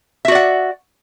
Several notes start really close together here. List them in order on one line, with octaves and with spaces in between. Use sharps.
E5 F#4 D5 F#5